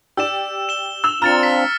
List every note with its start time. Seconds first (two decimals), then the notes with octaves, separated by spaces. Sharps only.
0.17 G4 D5 E6 E7
0.69 E7 G7
1.04 E6 F7
1.22 C4 D4 F4 A#5 F6 A6 C#7
1.40 A6 B6